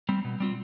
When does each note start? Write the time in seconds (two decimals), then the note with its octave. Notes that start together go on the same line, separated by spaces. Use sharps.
0.09 G3 C4
0.25 B2
0.40 G3 C4 F4